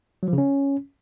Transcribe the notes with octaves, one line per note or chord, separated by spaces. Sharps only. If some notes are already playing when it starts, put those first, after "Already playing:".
F#3
F3
C#3
C#4